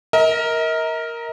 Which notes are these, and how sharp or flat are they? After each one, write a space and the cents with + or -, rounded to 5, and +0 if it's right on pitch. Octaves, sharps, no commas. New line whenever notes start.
A#4 +0 D#5 +45